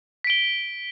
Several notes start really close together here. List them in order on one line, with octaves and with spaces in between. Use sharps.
B6 D7 G7